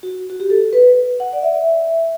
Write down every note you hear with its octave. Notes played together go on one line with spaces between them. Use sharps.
F#4
F#4
G4
A4
B4
F#5
D5
E5